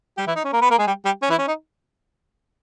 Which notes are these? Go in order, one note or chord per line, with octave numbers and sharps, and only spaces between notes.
G3 G4
E3 E4
D#4
C#4
A#3 A#4
B3 B4
A#3 A#4
G#3 G#4
G3 G4
G3 G4
C#4
E3 E4
C#4
D#4